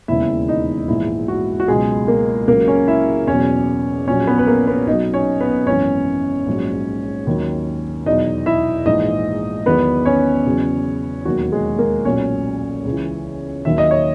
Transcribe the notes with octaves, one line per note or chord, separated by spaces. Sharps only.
E1 D#2 C#3 E3 E4 E5
D#4 D#5
A#1 G#2 E3 E4
F#4
F#4
C#2 B2 F#3 G#3 G#4
A#3 A#4
C#2 C#3 F#3 A#3 A#4
C#4 C#5
E4 E5
E2 B2 F#3 C#4 C#5
A#1 A#2 F#3 C#4 C#5
B3 B4
B4
A#3 A#4
B3 B4
B1 B2 F#3 D#4 D#5
C#4 C#5
B3 B4
G#1 F#2 E3 C#4 C#5
A#1 G#2 F#3
D#2 D#3 F#3
E2 B2 F#3 D#4 D#5
E4 E5
A#1 G#2 E3 D#4 D#5
E2 D#3 F#3 B3 B4
C#4 C#5
E2 C#3 F#3
E1 D#2 D#3 F#3 F#4
G#3 G#4
A#3 A#4
B1 A#2 F#3 C#4 C#5
C#2 C#3 E3
D#2 D#3 F#3 E5
D#5
C#5